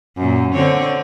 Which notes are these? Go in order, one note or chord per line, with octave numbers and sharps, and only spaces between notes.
F#2 A#2
D3 C4 C#5